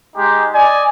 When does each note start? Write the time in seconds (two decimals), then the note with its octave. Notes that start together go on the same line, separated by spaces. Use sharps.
0.15 G#3 D#4 G4
0.54 D5 D#5 G#5